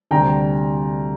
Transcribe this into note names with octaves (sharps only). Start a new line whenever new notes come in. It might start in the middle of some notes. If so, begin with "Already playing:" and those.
D2 C3 G3 D4 G5 A#5